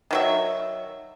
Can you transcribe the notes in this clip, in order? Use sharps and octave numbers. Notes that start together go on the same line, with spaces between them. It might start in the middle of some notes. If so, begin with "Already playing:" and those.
D#3 F#3 E5